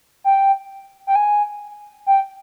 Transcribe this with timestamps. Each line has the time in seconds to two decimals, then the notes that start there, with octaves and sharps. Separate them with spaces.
0.24 G5
1.07 G5
1.15 G#5
2.06 G5